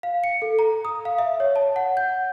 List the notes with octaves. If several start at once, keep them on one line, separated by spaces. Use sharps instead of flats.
F5
C#7
A4
A#5
D#6
F5
E5
C#5
A5
F#5
G6